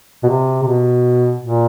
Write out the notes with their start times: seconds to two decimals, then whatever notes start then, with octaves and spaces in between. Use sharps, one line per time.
0.24 B2
0.29 C3
0.63 C3
0.67 B2
1.42 A#2